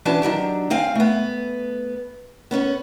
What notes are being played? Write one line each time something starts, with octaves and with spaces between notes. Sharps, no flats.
E3 C#4 D4 F#4 A5
D#3 F#3 D4 G4
D#2 C4 F5 G#5
A3 B3
B3 C#4 B4 C#5